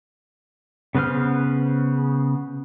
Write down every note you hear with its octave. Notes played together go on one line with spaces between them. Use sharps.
C#3 B3 B4 C5 F6